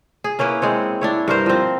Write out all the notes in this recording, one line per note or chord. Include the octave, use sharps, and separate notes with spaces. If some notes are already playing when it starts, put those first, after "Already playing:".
G#4
A#3 C#4 E4 B4
G#3 C4 C#5
D4 E4 C#5
G2 A#4 C5
F3 C4